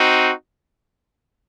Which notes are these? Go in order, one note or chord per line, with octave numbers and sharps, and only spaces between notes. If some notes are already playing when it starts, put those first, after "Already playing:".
Already playing: C4 D#4 F#4